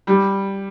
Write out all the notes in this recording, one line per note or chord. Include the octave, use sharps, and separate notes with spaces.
G3